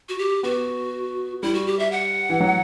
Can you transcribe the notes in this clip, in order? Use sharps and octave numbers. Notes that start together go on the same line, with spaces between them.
F#4
G4
B3 F#4
G3 E4
F#4
G4
E5
F#5
E3
F#3